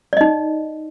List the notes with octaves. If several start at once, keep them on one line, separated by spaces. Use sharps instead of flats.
D#4 D5 D#5